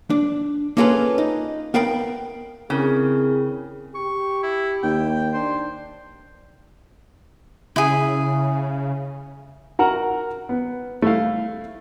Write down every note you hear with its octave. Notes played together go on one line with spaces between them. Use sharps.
D4
A#3 C#4 F4 G#4 A4 B4
D#4
B3 A#4 F5 G5 B5
C#3 C4 E4 G#4 A#4
G4 C#6
E4
D#2 G5
D4 C5
C#3 E4 G#4
F#4 A#4 F#5 A#5
B3
A3 E4 F5